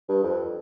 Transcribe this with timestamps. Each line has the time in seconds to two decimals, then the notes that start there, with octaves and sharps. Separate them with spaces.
0.09 G2
0.23 F2